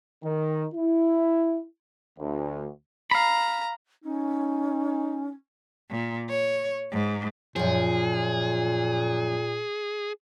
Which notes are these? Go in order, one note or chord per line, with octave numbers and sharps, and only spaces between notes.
D#3
E4
D2
F5 A#5 B5
C#4 D#4
A#2
C#5
G#2
F#2 A#2 F3 G#4